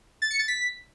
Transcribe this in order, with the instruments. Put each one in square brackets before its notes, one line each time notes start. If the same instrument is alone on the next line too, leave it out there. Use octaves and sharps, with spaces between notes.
[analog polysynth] A6
C#7
A6
B6